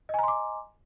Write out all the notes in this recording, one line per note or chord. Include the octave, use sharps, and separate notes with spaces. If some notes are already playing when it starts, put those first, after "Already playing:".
D#5 G#5 A#5 C6 D6